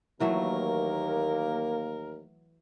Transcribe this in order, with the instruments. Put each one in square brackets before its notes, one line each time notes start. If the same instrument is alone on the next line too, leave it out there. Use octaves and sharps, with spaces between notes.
[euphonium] D#2 [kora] E3 F#3 A3 [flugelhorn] A#3 [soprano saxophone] A#4